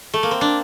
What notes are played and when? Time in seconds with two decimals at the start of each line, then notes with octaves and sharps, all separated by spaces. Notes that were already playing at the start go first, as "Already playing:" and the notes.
0.14 A3
0.23 A#3
0.31 C4
0.41 D4